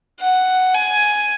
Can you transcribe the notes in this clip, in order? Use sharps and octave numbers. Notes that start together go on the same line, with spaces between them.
F#5
G#5